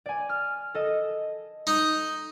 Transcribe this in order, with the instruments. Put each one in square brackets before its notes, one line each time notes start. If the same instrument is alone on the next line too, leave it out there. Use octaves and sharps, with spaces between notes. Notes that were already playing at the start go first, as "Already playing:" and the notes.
[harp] D5 G#5
F6
A4 D#5
[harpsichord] D#4